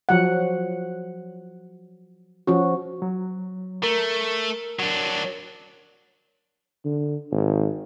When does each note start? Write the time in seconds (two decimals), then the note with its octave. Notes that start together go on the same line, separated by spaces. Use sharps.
0.09 F3 F#3 F#5
2.47 F3 C#4 F#4
3.02 F#3
3.83 A3 A#4
4.79 F#3 D4
6.85 D3
7.32 G#1